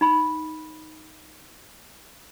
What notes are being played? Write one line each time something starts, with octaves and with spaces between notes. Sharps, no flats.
D#4 B5